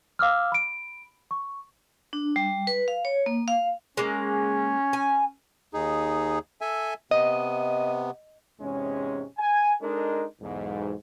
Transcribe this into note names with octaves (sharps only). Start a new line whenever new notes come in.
F5 D6 E6 F6
B5 D7
C#6
D4
G3
B4
F5
C#5
A#3
F5
G#3 A#3 C#4
G#5
D#2 D#4 G#4
A4 E5 G#5
C3 B3 D#5
E2 G#2 C3 G#3 C#4
G#5
G#3 D4 D#4 A4 A#4
B1 E2 G#2